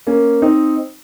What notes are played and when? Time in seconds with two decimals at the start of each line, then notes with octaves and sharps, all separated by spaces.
0.07 A#3 C#4
0.42 C4 D#4